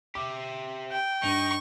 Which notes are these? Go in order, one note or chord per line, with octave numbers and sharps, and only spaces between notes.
G4 E5 D6
G5
G2 D#4 C#6